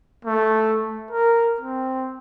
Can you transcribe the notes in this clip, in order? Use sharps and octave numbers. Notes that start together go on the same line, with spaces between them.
A3
A#4
C4